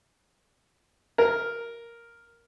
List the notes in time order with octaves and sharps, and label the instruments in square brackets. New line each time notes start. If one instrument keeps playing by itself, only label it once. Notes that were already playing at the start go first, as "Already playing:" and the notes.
[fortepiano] A#4